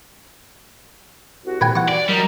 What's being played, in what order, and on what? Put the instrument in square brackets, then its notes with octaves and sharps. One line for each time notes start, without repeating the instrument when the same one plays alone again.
[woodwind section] C2 F#4
[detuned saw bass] A#2 [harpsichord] B4 G5 G#5
[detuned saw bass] E3 [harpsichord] F#5 C#6
[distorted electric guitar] D5
[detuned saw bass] F#3 [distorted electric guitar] G3 [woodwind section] A#4 D#5 A#5